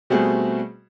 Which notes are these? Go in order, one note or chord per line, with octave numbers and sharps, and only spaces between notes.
B2 G3 A3 C4 F#4 G#4